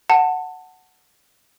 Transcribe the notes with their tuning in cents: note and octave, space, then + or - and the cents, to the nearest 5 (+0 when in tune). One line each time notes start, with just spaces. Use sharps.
F#5 +0 A5 +20